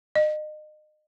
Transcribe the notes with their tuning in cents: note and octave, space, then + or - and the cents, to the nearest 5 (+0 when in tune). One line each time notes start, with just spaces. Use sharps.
D#5 -30